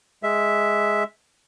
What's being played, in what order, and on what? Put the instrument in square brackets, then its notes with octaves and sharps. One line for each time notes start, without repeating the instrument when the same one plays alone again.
[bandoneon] G#3 E5